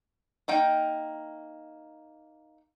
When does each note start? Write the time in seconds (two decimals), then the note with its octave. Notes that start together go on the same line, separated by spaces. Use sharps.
0.48 A#3 D#4 G5